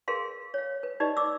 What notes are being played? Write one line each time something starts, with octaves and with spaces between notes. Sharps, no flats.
G#4 A#4 B4 F5 C6
C#5 F5
B4
D#4 G4 B4 D5 D#5
D6 E6